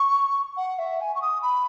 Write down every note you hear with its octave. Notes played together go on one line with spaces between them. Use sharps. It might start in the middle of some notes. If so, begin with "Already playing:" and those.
Already playing: C#6
F#5
E5
G#5
C#6
D#6
B5